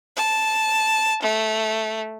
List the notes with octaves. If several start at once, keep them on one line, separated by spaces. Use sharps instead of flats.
A5
A3